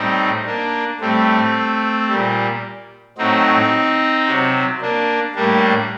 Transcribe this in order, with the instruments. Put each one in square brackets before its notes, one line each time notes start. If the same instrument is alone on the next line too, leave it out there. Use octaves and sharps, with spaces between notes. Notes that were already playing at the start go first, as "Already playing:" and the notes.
Already playing: [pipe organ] A2 G3 C4 D#4
A#3 D4
A2 G3 A3 C4
A#2 G3
A2 F#3 C4 D#4
C3 F#3
A#3 D4
A2 G3 A#3 D4